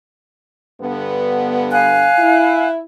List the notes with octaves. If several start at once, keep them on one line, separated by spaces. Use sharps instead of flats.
G2 D3 B3
F5 G#5 F#6
E4